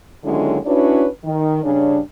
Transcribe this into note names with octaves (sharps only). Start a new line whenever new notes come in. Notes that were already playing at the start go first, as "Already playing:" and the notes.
D#2 D3 F#3 G#3 C#4 E4
C#4 D4 E4 F#4 B4 C#5
D#3
G2 C#3 C#4 D4